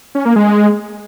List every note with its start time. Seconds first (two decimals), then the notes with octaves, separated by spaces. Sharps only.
0.15 C#4
0.25 A#3
0.36 G#3